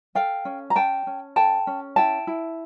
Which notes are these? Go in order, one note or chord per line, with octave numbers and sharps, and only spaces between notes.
A4 F5 G5
C#4
A#5
C#4 G5 A5
C#4
A4 G5 A5
C#4
E4 G5 A5
E4